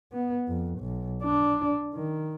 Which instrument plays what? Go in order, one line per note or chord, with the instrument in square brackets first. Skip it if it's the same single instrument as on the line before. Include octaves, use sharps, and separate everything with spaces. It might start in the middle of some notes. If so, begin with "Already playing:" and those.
[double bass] B3
F2
B1
D4
D#3